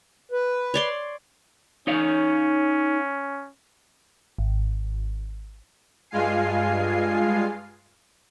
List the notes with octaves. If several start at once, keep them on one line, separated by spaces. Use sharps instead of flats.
B4
C#5 D5 C6
C#4 D#4 C#5 F5
G#1
G2 G#3 F4 F5 G#5 C7